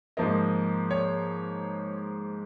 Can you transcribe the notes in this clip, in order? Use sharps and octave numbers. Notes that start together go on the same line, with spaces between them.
G#2 F3 A#3 D#5
C#5